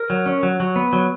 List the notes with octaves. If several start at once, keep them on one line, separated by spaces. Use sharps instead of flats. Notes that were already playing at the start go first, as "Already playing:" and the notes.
Already playing: A#4
F#3
C#4
F#3
F#3
B3
F#3